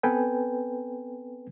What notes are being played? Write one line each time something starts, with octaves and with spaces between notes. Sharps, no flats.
B3 C4 A4 B4 G5 G#5